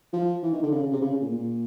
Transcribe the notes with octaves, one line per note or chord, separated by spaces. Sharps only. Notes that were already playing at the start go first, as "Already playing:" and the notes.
F3
E3
D#3
D3
C#3
C#3
C3
C#3
C#3
A#2
A#2